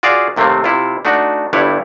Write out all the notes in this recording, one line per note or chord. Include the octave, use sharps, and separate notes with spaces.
F4 F#4 G#4 D5 E5 F5
D#2 C3 A3 A#3 C4
C3 E4 F4
A3 D4 D#4 F#4
G1 G2 G3 E4 B4 C#5